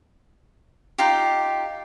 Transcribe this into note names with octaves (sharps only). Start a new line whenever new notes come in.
D#4 F4 G4